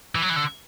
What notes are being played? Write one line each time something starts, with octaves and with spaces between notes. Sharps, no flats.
E3
F#3
E3
D3